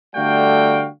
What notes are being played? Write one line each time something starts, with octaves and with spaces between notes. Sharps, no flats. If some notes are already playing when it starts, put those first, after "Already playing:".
D3 G3 A3 F#4 F5 G5